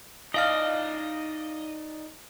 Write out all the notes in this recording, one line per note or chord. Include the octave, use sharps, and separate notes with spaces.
D#4 E4 D5 D#5 F5 F6